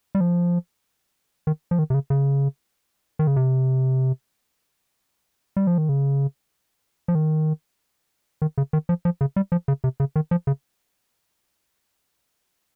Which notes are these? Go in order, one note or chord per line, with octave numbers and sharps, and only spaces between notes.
G3
F3
D#3
F3
D#3
C3
C#3
C#3
D#3
C#3
C3
G3
F3
D#3
C#3
F3
D#3
D#3
C#3
D#3
F3
F3
C#3
G3
F3
C#3
C3
C#3
D#3
F3
C#3